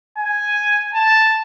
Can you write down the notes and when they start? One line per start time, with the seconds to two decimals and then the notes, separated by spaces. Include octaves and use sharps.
0.18 G#5
0.94 A5